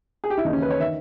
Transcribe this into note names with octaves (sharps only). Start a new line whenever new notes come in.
G#4
G4
E4
D#2 C#3 E3 D#4
C#4
B4
C#5
D#3 E5